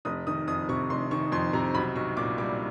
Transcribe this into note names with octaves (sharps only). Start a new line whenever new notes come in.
F1 D#6
D#3 D#6
F2 D#6
C3 C#6
F1 C6
D#3 C#6
F2 C6
C3 A#5
B1 B5
B1 C#6
A#2 D6
G3 D6